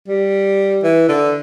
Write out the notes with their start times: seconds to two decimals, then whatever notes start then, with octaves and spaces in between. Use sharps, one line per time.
0.08 G3
0.83 E3
1.09 D3